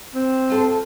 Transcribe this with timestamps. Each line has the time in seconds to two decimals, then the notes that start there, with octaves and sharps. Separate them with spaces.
0.15 C4
0.50 F4 A4 C5